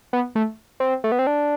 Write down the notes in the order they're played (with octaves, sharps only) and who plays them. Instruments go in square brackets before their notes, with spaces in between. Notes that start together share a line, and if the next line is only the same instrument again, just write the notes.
[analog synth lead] B3
A3
C4
A3
B3
C4
D4